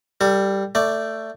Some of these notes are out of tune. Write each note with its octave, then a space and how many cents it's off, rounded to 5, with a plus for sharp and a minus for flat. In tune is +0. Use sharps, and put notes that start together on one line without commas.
G3 +0 A4 +35
A3 +15 D5 +0